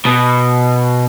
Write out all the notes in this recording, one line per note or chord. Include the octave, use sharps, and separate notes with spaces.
B2